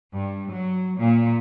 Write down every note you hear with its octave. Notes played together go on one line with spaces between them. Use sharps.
G2
F#3
A#2